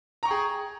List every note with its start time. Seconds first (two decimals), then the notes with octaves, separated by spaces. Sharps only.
0.23 A#5
0.25 C#6
0.28 G5
0.31 G#4